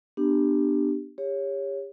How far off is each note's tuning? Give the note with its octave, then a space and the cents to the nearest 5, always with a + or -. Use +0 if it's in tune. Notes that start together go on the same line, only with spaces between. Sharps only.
B3 +0 D4 +20 G4 +0
G4 +35 C#5 +0